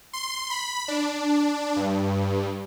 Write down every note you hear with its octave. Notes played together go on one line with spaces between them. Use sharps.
C6
B5
D4
G2